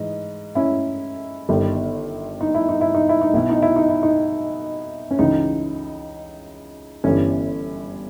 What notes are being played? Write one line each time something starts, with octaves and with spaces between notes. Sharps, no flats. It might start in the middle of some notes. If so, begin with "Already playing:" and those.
Already playing: G#2 E3 D#5
C#4 E4
G1 G2 D#3
D#4
E4
D#4
E4
D#4
E4
D#4
B1 B2 E4
D#4
E4
D#4
E4
D#4
C#4
C#2 C#3 E3 D#4
G1 G2 E3 C#4